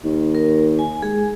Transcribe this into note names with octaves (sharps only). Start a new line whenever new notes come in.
D#2
A#4
G#5
G#3 G#4